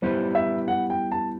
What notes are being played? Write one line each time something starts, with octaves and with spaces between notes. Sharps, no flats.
G3 B3 E4 G4 B4 C5
E5
F#5
G5
A5